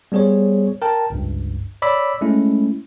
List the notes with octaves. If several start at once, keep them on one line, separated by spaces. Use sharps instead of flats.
G3 B3 G#4 C5 C#5
A#4 G5 A5
G1 C#2 G2
C#5 D5 B5 D6 E6 B6
G#3 A3 C#4 E4